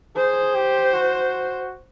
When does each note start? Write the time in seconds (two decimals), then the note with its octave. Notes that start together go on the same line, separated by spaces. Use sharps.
0.16 G#4 C5
0.55 G4
0.93 F#4